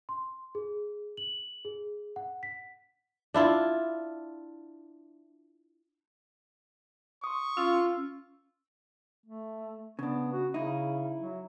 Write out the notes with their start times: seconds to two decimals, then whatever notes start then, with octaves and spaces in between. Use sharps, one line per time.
0.09 C6
0.55 G#4
1.17 F#7
1.65 G#4
2.16 F#5
2.43 B6
3.34 D4 E4 F4
7.24 C6 C#6 D#6
7.57 C#4 F4 E6
9.26 A3
9.99 C#3 B3 D4
10.33 F#4
10.54 C#3 D#4 E4
11.19 F#3